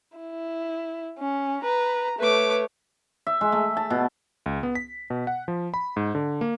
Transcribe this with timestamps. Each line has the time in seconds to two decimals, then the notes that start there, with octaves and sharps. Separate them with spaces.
0.18 E4
1.19 C#4
1.63 B4 A#5
2.19 A3 B4 C#5 D6
3.27 E5
3.41 G#3
3.52 A3
3.77 A5
3.90 B2
4.46 C#2
4.63 B3
4.75 B6
5.10 B2
5.27 F#5
5.48 F3
5.74 B5
5.97 G#2
6.15 D3
6.41 A#3